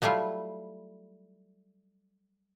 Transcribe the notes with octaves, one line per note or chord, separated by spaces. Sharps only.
F#3 G3 A3 E4 F4